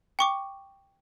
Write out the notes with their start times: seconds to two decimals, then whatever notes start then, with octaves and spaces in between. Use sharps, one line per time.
0.19 G5 C#6 D6